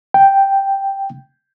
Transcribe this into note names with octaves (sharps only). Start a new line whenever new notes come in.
G5